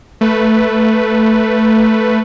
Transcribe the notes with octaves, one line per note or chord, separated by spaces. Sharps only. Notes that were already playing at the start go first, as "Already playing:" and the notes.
A3 B4